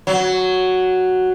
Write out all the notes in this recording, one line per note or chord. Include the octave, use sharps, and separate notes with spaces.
F#3